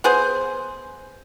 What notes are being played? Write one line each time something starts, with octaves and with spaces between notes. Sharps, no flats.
B3 G#4 C5